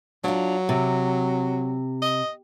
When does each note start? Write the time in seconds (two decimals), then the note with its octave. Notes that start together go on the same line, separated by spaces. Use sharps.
0.24 F#3 D4 F4
0.69 C3
2.02 D#5